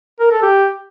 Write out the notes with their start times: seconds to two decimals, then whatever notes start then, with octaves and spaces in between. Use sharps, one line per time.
0.20 A#4
0.31 A4
0.43 G4